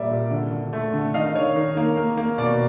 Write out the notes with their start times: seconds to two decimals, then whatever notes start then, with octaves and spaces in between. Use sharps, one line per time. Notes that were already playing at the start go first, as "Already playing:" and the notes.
Already playing: A#2 G3 A#3 D5 E5
0.10 A#2
0.31 D3
0.52 D3
0.73 A3
0.93 D3
1.14 D#3 D#5 F5
1.34 D#3 C#5
1.56 D#3
1.77 A#3
1.97 A#3
2.17 A#3
2.38 B2 D5